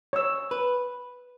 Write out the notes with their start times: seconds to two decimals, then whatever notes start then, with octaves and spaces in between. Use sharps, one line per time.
0.13 C#5 E6
0.51 B4